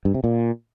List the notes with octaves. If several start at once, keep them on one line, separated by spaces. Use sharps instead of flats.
G2
C3
A#2